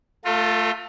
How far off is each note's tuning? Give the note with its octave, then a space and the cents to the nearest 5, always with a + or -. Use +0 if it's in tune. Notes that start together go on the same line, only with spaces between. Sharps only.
A3 +0 F4 +15 A4 +40